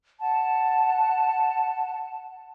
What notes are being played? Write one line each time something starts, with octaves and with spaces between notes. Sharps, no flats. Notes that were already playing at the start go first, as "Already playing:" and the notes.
F#5 A5